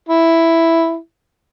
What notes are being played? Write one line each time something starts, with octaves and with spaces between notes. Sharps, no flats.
E4